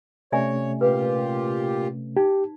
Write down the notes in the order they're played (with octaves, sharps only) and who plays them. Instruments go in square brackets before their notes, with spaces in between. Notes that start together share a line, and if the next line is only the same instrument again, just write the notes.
[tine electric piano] C3 A3 C#4 [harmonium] C#5 [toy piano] D5 E5 G#5
[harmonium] A#2 F4 G4 [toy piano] B4
[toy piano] D#4 [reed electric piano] G4